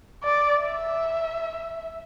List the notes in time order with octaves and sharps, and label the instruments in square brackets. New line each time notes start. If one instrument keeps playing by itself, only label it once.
[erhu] D5
E5